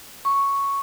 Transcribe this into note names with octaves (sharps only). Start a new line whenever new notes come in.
C#6